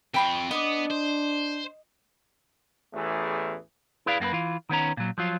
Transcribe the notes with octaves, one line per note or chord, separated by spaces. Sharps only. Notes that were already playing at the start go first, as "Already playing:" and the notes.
F2 C4 G5 B5 C#6
B3 D4 D#5 D6
C5
A1 E2 E3 A3 G#4
E4 G#4 B4 D5 F5
F#2 A#3 G#4 B4
E3 F4
D#3 B3 C#4 A#5
A#2 F#3
F3 F#3 F4